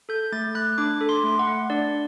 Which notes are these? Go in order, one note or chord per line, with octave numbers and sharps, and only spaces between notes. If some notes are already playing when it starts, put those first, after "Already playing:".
A4 G6
A3 A6
A3 F#6
D4 D6
A4
C6
A3
F#5
A3
D4 D5